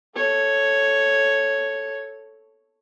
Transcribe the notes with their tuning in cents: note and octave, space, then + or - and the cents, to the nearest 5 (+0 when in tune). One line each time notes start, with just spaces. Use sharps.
A4 +0 C#5 +0